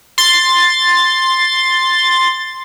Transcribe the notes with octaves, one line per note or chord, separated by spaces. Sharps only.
C6 A6